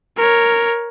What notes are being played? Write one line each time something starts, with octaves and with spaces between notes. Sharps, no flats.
A#4 C#5